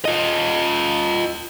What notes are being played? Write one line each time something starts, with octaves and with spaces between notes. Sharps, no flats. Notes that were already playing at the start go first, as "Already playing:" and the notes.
F4 D#5